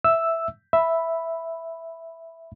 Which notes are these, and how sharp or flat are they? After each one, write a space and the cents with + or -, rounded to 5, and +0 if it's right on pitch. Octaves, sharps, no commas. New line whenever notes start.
E5 +0 E6 +0
E5 +0 B5 +0